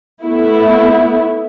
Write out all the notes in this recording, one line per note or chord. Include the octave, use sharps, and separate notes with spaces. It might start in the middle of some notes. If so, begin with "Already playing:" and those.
A3 B3 E4